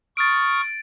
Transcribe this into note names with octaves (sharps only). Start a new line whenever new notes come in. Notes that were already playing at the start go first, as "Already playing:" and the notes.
C#6 D#6 F6 A6 D7